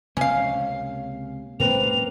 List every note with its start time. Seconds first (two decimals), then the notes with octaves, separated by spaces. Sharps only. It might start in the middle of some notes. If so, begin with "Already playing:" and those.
0.17 C#2 C3 A#3 C#4 F5
1.60 G#2 F#3 A#3 C4 C#4 B4 F7